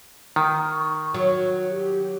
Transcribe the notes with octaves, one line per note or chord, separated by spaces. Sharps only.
D#3
C#6
F#3 F#4
G4